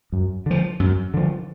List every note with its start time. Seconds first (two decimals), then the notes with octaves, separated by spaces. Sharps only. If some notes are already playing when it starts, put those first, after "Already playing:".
0.12 F#2
0.46 D3 F3
0.80 F#2
1.14 D3 F3